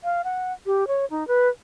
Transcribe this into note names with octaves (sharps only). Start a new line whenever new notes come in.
F5
F#5
G4
C#5
D#4
B4